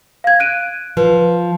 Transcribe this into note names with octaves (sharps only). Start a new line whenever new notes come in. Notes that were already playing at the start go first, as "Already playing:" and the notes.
F5 G#6
F#6 D7 D#7
F3 B4